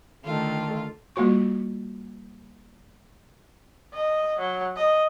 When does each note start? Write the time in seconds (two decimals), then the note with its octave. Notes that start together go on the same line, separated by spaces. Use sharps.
0.25 D3 D#3 A3 F4
1.16 G3 A#3 F4 F#4 C#6
3.94 D#5
4.39 F#3
4.77 D#5